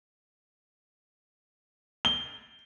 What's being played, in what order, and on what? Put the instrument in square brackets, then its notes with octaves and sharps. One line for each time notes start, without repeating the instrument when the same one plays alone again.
[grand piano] G7